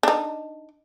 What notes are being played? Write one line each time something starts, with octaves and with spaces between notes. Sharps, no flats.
D4 D#4